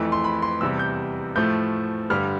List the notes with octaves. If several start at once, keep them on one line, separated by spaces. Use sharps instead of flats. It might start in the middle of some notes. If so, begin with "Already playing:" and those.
Already playing: F2 E3 A3
C6
B5
C6
E2 C3 G3 E6
G6
A2 F3 A3 G6
G2 D3 G3 F6